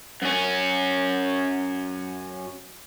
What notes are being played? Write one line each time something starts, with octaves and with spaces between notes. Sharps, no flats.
F#2 C#4